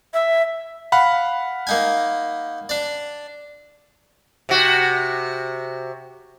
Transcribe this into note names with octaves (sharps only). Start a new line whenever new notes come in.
E5
F5 F#5 B5
A#3 D#4 G#5
D4 D5
C3 F#4